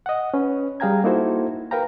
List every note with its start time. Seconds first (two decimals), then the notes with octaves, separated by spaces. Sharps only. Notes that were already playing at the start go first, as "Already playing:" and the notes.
0.06 D#5 F#5
0.34 C#4 B4
0.80 G3 G#4 F5 G5 A#5 G#6
1.04 A#3 D#4 E4 F#4 A4 C5
1.71 A#4 B4 F5 G5 A#5